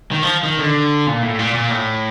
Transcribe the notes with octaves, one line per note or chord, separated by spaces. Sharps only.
D#3
F3
D#3
D3
A#2
A2
A#2
A#2
A2